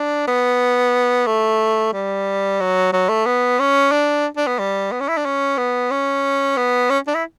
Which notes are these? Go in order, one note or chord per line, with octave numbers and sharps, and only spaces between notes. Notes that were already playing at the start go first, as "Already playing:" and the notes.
Already playing: D4
B3
A3
G3
F#3
F#3
A3
B3
C#4
D4
D4
B3
G3
B3
C#4
E4
D4
C#4
B3
C#4
B3
C#4
D4
E4